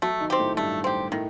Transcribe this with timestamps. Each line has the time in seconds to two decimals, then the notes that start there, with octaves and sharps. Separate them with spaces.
0.02 F#3 A3 F#4
0.20 D#3 D#4
0.30 C4 G4
0.39 A2 A3
0.57 G2 G3 A3
0.84 C4 G4
1.12 A2 D#3 A3